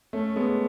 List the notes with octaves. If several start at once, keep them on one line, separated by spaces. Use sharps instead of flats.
A3 C#4
G#3 B3